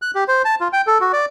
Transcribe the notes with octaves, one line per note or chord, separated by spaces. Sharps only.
F#6
G4
C5
A5
F4
G5
A4
F#4
D5